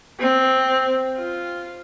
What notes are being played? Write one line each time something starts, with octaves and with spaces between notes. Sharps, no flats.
C4
F4